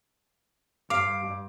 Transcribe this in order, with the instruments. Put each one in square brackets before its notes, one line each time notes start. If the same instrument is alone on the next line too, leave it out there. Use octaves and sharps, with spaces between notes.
[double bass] G2 [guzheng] F5 [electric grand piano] D6